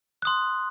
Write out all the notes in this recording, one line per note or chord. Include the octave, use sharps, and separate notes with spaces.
C6 D#6 F#6